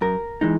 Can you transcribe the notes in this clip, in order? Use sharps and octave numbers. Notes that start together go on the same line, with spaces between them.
F#2 A#4
E3 G#3 D#4